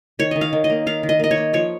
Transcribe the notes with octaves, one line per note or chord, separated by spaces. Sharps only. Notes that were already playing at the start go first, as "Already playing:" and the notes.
D#3 C#5
D#3 D#5
F5
D#3
D#5
A#3
D#3 F5
D#3
D#5
A#3 D#5
C#5
A#3
F3 C#5